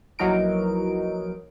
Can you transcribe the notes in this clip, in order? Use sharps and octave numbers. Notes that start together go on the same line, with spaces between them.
A#1 E3 F#3 D#4 A#4 D7